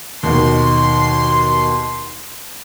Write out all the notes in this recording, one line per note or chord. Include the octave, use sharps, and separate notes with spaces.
D#2 B2 D#3 C6